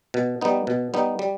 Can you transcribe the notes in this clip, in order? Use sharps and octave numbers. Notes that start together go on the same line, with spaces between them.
B2
G3 B3 D#4
B2
G3 B3 D#4
G3